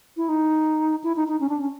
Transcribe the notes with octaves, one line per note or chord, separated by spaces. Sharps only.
E4
D#4
E4
D#4
D#4
C#4
D4
C#4